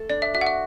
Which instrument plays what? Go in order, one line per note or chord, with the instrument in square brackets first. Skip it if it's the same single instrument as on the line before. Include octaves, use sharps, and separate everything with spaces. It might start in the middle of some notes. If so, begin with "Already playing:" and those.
Already playing: [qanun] A3 A4
[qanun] D4 [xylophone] D5
[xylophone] E5
[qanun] F#4 [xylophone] E5
[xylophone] F#5
E5